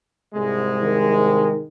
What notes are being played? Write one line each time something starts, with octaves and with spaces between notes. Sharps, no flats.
C2 G#2 G#3
D#3